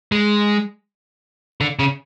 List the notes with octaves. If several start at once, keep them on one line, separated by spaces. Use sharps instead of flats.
G#3
D3
C#3